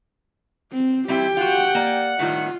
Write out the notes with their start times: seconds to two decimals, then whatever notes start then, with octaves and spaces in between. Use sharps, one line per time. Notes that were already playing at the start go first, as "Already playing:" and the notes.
0.72 C4
1.08 G3 C4 E4 G4 G5
1.37 F4 F#4 F#5
1.75 A#3 D5
2.19 A2 D#3 G3 F4